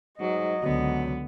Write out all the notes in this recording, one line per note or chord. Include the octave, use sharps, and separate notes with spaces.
G#2 F#3 D#5
C#2 D3 F#3 B3